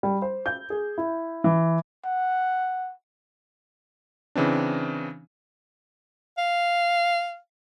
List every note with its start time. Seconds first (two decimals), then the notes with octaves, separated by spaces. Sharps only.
0.03 G3
0.22 C5
0.46 G6
0.70 G#4
0.98 E4
1.44 E3
2.05 F#5
4.35 C#3 E3 C4 D4
6.38 F5